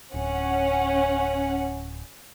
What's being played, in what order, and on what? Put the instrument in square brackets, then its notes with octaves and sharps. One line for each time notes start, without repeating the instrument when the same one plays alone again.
[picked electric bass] D1 [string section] C#4 F#5